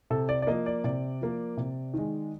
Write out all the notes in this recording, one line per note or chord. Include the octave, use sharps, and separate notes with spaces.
C3 A4
D5
D5
F3 A#3 D#5
D5
C3 D5
F3 A#3
C3
D#3 G#3